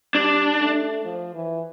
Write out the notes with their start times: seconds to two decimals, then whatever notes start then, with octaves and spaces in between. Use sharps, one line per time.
0.14 G3 D4
0.60 A3
1.05 F3
1.34 E3